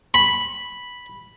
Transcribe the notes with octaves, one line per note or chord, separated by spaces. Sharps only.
B5